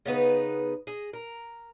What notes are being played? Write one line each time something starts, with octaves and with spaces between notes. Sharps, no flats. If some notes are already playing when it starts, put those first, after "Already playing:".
C#3 B3 D#4 B4
G#4 D#5
A#4